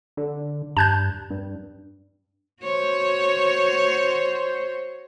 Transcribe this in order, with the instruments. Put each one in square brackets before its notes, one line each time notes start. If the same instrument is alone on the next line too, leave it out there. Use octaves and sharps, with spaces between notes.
[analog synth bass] D3
[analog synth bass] G2 [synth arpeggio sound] A5 F#6 G6
[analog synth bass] G2
[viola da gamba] F#4 C#5 [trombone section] C5